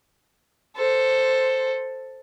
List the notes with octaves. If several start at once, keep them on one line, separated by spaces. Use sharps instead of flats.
A4 C5